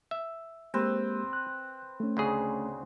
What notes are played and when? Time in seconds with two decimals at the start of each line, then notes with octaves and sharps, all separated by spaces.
0.11 E5
0.74 G#3 A#3 C4 G4 B4
1.33 F#6
2.00 A3 C#4
2.17 D2 C#3 G#4